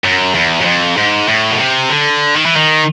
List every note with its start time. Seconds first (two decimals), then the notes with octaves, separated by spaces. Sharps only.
0.04 F#2
0.35 E2
0.61 F#2
0.66 F2
0.97 G#2
1.28 A2
1.51 B2
1.59 C3
1.90 D3
2.36 D#3
2.46 E3
2.56 D#3